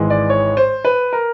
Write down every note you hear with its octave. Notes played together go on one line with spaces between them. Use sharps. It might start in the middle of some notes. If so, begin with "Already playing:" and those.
Already playing: G#1 G#2 E3 G#3
D5
C#5
C5
B4
A#4